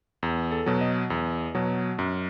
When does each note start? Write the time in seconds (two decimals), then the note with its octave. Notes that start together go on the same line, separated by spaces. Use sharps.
0.23 E2
0.52 A4
0.66 B2 F#3
0.81 D#5
1.10 E2
1.55 B2 F#3
1.99 F#2